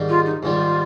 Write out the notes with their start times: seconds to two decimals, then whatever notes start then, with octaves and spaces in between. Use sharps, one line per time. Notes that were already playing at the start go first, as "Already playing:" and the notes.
Already playing: G#2 D#3 G3
0.09 F4
0.26 D#4
0.43 G#2 D#3 G3 F4